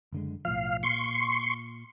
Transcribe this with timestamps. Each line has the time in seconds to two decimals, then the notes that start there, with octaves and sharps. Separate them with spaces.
0.13 F#1 D3 G#3
0.45 B1 A2 F3 F5
0.83 A#2 C6 C#6